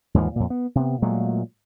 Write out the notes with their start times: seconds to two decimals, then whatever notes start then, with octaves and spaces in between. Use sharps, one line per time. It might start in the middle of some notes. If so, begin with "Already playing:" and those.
0.14 D#2 G#2 E3 F3
0.36 F2 A#2
0.50 B3
0.75 C3 B3
1.02 A#2 F#3 G#3 A3